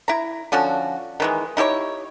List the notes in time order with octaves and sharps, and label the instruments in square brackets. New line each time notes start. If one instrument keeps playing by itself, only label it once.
[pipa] E4 A#5
D3 F3 C#4 F#4
D#3 E3 G#3
D#4 E4 G4 C#5